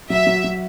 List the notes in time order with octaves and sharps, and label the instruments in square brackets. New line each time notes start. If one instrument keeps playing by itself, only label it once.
[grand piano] F#3 [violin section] E5
[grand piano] F#3
F#3